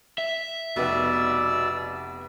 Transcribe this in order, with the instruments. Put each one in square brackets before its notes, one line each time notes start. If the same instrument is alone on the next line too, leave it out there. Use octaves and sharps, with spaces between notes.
[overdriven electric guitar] E5
[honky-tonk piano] F1 B3 [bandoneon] B2 D5 E6